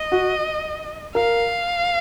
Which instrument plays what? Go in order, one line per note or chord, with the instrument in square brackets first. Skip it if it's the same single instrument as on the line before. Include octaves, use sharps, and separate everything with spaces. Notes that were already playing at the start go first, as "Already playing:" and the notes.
Already playing: [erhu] D#5
[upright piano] F#4
[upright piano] A#4 [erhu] F5